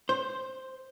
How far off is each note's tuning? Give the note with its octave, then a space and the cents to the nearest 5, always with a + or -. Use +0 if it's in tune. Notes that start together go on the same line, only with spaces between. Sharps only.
C5 +0